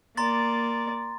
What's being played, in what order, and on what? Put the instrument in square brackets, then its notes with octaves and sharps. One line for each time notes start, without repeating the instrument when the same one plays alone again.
[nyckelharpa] A#3 D5 [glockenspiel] A#5 C6 A6